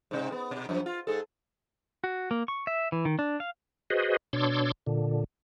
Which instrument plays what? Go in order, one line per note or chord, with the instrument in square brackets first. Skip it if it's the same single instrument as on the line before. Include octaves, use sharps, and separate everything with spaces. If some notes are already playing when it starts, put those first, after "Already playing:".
[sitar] G#2 C3
B3
B2
F#2 F3
F4
G#2 G#4 A4
[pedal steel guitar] F#4
A#3
C#6
E5
E3
D#3
D4
F5
[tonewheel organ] F#4 G#4 B4 C5 D#5
B2 D4 C#5 C6 D6 E6
A#2 D3